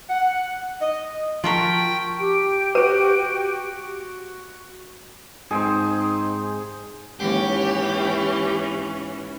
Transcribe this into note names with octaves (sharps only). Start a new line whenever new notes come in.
F#5
D#5
F3 F4 F#4 A#4 G5 A5 C#6 B6
G4 D7
F#4 B4 D#7
G#2 C4 D#4 G#4 C5
D#2 G#2 E3 C#4 G4